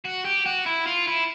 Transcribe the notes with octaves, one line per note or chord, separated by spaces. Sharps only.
F#4
G4
F#4
E4
F4
E4